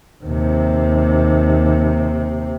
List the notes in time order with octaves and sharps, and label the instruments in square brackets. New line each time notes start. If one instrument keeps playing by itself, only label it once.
[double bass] D#2 C3